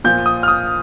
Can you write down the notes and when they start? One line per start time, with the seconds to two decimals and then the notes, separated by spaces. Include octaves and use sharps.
0.04 A#2 F3 G6
0.26 D#6
0.43 F6
0.48 D#6